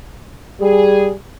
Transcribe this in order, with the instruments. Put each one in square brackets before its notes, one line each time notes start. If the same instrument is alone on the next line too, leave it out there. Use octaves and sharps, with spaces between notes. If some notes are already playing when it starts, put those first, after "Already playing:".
[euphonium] G3 [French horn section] G#4